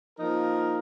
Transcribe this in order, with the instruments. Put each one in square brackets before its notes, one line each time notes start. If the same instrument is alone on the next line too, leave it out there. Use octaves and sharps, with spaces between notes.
[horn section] F3 A#3 D#4 A#4